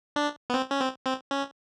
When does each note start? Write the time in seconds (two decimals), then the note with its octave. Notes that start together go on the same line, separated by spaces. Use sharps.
0.16 D4
0.50 B3
0.54 C4
0.71 C#4
0.80 C4
1.06 C4
1.31 C#4